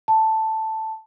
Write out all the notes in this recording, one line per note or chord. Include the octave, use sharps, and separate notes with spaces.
A5